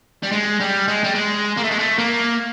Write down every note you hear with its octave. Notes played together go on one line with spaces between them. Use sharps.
G3
G#3
G3
G#3
G3
G#3
A#3
A3
G#3
A3
A#3